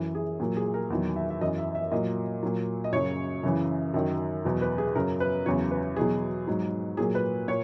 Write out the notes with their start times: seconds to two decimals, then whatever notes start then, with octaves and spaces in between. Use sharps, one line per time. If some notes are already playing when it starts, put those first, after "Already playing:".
Already playing: F#2 E3
0.15 G#4
0.40 A#2 F#3
0.57 G#4
0.74 A#4
0.90 E2 D#3 F#3
1.16 E5
1.30 E5
1.41 F#2 E3 D#5
1.58 E5
1.75 E5
1.92 A#2 F#3 D#5
2.43 A#2 F#3
2.84 D#5
2.93 F#2 C#3 F#3 C#5
3.43 F#2 C#3 E3
3.94 F#2 D#3 F#3
4.45 E2 B2 F#3
4.61 B4
4.78 G#4
4.96 F#2 C#3 F#3 A#4
5.20 B4
5.46 E2 C#3 F#3 C#5
5.71 B4
5.96 E2 B2 F#3 G#4
6.47 G#2 F#3
6.97 A#2 F#3 G#4
7.15 B4
7.48 A#2 C#5